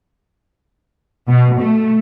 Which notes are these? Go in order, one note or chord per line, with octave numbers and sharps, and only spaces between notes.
B2
A3